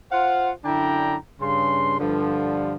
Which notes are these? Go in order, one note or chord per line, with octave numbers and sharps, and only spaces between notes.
F4 C5 F5 F#5
F#2 D3 D4 E4 G5 A#5
G2 C#3 C6
G2 D3 F3